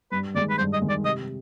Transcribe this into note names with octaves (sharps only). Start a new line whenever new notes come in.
G2 B4
D#3 G#3 D5
B4
G2 C5
D#5
D#3 G#3
D5
C3 D#5